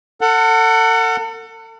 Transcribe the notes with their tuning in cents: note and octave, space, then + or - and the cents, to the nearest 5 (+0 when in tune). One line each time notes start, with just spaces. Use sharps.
A4 +40 F#5 +0